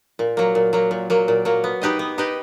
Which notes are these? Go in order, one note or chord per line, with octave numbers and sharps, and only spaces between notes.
A#2
F#3 A#3
A#2
F#3 A#3
A#2
F#3 A#3
A#2
F#3 A#3
B3
D#4 G4 B4 D#5
B3
D#4 G4 B4 D#5